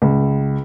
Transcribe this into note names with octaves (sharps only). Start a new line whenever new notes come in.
C#2